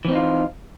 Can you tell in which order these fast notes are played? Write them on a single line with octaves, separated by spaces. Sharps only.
E3 C4 D#4 F4